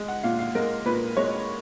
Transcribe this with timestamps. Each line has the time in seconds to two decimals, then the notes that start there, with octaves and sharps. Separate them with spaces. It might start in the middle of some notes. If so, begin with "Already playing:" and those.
Already playing: G#3
0.08 F#5
0.23 A#2 F5
0.39 F5
0.55 G#3 A#4
0.86 A#2 B4
1.17 G#3 C#5